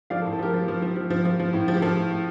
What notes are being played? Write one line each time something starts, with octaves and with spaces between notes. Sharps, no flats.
F3 D5 F5
A4
A2
A4
F3 G4 A#4
F3
F3
F3
F3
F3
F3
F3
A2
F3
G4
F3 A4
A2
A2